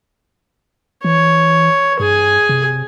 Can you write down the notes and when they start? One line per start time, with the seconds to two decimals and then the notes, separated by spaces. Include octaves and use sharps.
1.04 E3 C#5
2.00 G2 G#4 G#5
2.49 C3